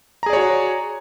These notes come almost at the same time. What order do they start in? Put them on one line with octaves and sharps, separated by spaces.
A#5 G#4 D5 C#5 F#4